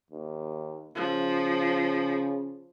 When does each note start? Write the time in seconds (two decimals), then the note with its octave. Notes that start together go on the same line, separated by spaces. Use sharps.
0.11 D#2
0.95 C#3 F3